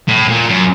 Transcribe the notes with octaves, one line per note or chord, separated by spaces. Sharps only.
A2
A#2
F#2